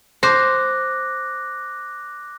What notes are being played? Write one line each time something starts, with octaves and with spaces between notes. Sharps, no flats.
C5 D6 F#6 A#6